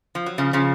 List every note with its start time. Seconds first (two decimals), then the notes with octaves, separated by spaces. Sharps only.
0.15 F3
0.26 F#3
0.38 C#3 F3
0.53 C#3 F3